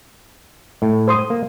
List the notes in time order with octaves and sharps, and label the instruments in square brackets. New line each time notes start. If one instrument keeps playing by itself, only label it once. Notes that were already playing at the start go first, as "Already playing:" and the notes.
[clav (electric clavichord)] A2
[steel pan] C5 C6 D#6
[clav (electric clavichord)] A#3